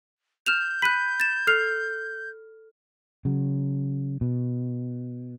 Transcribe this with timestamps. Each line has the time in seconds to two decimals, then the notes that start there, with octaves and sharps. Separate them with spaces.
0.46 F6 G6 E7 F7
0.82 B5 F#6 B6 D#7
1.20 A6 E7
1.47 A4 F6 C7 F7
3.25 C#3 F#3
4.21 B2